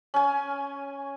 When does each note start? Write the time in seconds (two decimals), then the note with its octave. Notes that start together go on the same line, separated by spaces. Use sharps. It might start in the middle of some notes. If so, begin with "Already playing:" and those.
0.14 C#4 G#5